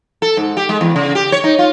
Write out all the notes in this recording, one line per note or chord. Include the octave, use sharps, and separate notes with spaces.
A4
G#2
G4
G#3
E2
C#3
G4
C#5
D#4
F4